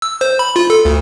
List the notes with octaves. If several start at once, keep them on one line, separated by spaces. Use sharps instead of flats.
E6
C5
B5
F4
A4
D2